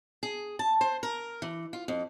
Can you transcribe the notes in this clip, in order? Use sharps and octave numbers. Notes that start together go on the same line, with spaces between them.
G#4
A5
C5
A#4
E3
F4
F2